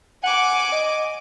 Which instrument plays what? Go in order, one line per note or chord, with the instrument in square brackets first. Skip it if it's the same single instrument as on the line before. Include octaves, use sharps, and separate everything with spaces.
[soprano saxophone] F#5 [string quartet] G#5 D6
[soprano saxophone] D#5